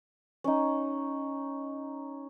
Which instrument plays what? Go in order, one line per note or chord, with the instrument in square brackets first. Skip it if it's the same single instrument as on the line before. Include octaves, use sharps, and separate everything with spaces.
[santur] C#4 D#4